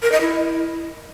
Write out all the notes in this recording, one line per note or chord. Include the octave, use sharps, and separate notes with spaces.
A#4
D#5
E4